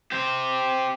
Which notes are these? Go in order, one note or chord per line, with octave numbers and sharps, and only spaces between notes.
C4 G4